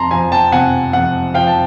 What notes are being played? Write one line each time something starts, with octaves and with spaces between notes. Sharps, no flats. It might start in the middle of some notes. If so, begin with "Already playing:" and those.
Already playing: F2 A5 A#5 C6
F3 G#5 A#5
G5 A5
C3 F#5 G#5
F2 F#5
F3 F5 G5
A5